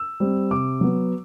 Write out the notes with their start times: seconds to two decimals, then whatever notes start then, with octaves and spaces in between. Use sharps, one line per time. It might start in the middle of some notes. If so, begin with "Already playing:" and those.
Already playing: E6
0.20 G3 C4
0.51 C3 D6
0.81 F#3 B3